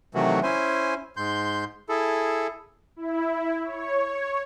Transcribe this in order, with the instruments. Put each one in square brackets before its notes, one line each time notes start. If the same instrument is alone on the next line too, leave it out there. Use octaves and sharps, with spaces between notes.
[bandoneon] C3 D#3 E3 F#3 A3 F#4
C#4 E4 C5 G#5
G#2 C6 G6
E4 G#4 A4
[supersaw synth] E4
C#5